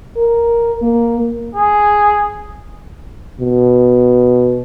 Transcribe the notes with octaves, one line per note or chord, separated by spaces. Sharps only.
A#4
A#3
G#4
B2